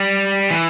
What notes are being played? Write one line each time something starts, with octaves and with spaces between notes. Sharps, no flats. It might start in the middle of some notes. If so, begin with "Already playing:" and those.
Already playing: G3
E3